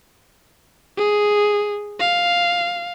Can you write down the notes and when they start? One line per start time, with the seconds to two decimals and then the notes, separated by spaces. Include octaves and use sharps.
0.97 G#4
2.00 F5